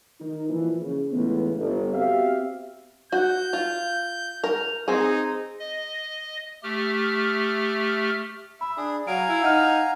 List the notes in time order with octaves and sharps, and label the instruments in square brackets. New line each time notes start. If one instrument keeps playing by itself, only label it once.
[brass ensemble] D#3 D#4
A#2 E3 F3
C#3
C#2 A2 E3 B3
G1
B3 C4 F#4 G4 E5 F5
[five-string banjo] F#4 [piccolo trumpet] G6
[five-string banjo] F4
A#4
[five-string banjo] C4 G#4 [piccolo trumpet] D#4
[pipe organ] D#5
A3 G4 F6
[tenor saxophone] E5 [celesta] B5
[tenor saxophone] D4 [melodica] G#4
[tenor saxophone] F#3 [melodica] F5 G#5 A#5 [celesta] D7
[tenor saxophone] E4
[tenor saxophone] D#4 [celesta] F#5 F6